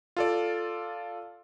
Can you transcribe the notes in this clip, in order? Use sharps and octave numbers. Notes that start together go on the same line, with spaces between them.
F4 A4 D5